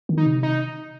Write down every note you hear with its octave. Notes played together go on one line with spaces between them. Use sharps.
D#3
D#4
C3
D#4